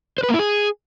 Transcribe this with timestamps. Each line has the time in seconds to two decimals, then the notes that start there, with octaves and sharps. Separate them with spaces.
0.18 C5
0.23 B4
0.29 A#3
0.34 E4
0.39 G#4